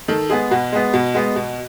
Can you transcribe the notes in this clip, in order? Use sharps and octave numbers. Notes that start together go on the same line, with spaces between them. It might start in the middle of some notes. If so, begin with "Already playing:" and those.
D#3 A4
G#3 B3 G#4
B2 F#4
G#3 B3
B2
G#3 B3
B2